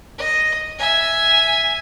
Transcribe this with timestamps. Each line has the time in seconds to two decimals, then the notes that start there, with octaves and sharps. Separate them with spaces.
0.18 D#5
0.79 E5 G#5